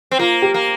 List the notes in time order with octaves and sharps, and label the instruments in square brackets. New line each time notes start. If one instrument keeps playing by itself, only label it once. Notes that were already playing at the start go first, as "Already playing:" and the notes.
[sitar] C4
[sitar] A#3 [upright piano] F4
[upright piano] G4
[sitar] A#3